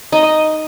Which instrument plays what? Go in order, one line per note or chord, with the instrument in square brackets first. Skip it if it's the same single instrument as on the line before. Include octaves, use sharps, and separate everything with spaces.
[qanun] D#4 [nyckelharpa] D#5